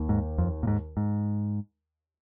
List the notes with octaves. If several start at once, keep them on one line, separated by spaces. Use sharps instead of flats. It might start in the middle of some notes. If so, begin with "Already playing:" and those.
Already playing: D#2 D#3
G#2
F2
A#2
G#2
G#2